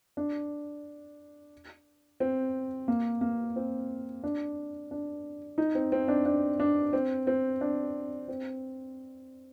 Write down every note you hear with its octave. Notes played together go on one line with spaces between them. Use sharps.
D4
C4
A#3
A#3
C4
D4
D4
D#4
C4
C4
D4
D4
D4
C4
C4
D4
C4